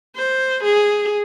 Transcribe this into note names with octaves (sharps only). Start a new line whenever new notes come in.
C5
G#4